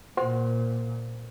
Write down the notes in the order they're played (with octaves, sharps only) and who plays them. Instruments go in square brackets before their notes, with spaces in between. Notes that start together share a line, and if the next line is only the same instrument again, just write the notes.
[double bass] A#2 [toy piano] C5 F#5 C6